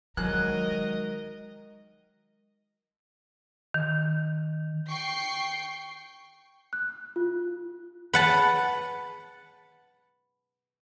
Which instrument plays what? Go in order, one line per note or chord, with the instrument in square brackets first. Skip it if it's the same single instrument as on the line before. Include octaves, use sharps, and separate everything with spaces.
[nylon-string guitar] D#3 F#3 C5 [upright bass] G#3 [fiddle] A#4 D#5 [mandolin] F#6
[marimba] D#3
[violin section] G5 C#6 C7
[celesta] F#6
F4
[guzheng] B4 F#5 A5